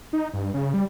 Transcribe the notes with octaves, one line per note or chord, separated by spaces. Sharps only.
D#4
G2
C#3
G3